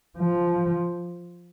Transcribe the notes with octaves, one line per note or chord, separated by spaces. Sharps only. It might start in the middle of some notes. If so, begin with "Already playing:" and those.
F3